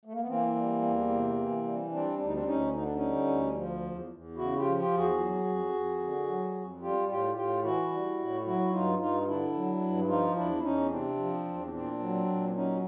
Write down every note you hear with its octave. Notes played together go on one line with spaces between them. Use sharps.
A3
A#3
B3
E3 A#3 C4
G3
E2
C3
E3
G3
G3 C4 D4
D2 D4
D#4
C4 D4
D2 C#4 D#4
D3 D#4
D4
C#4 D#4
G3
D2
F3
E2
E2
C#3 E4 F#4
F4 G4
F3
F4 G4
E2
F#4 G#4
F#3
F2
F2
D3
F#3
F2
G3 F4 G4
A2 F4 G4
A2 F4 G4
E3 E4 F#4
G3
A2
F#3 E4 F#4
G2 D#4 F4
G2 D#4 F4
F4
D3 D4 E4
F#3
G2
F3 D#4 F4
E2 D4 E4
E2 C#4 D#4
C3 C4 D4
F3
E2
A#2 C4 D4
F#3
A#2
F#3 C#4 D#4